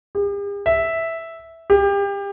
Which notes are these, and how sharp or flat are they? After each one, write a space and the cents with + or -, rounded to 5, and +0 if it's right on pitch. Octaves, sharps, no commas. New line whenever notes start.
G4 +45
E5 -5
G4 +30